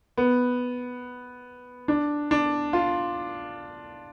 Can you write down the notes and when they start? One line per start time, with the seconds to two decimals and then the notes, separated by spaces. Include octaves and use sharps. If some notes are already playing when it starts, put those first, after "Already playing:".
0.18 B3
1.88 D4
2.31 D4
2.73 F4